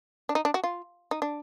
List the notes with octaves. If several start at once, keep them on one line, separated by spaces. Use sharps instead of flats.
D4
D#4
D4
F#4
F4
D#4
D4